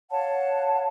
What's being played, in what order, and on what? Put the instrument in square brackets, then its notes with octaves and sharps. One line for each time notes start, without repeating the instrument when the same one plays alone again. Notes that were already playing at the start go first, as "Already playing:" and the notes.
[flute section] C#5 F5 F#5 A5